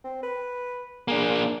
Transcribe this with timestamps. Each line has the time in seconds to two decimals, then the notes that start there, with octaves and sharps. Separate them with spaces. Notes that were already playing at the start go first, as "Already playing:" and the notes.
0.04 C4
0.23 B4
1.08 A#3 D4 G#4